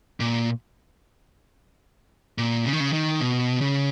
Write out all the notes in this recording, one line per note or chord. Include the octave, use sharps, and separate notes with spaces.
A#2
A#2
C#3
D#3
C#3
D#3
B2
C#3